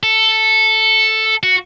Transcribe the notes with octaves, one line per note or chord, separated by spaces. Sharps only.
A4
F#4